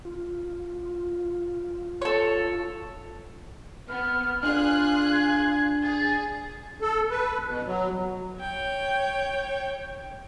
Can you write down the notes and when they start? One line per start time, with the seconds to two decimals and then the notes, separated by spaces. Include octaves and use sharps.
0.05 F4
2.02 A4 C#5
3.89 B3 F6
4.43 D4 F4 G#4 F#6
5.12 G#6
5.83 G#4 A6
6.82 A4
7.10 B4
7.47 B2
7.66 F#3
8.39 C#5 G5